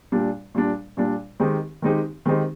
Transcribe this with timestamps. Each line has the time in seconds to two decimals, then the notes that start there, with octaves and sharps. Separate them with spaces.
0.12 A#2 G3 D4
0.54 A#2 G3 D4
0.97 A#2 G3 D4
1.40 D#3 G#3 C4 D#4 G4
1.82 D#3 G#3 C4 D#4 G4
2.26 D#3 G#3 C4 D#4 G4